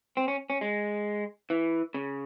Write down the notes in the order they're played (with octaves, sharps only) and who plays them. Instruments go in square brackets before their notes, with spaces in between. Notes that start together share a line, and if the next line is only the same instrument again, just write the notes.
[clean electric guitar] C4
C#4
C#4
G#3
E3
C#3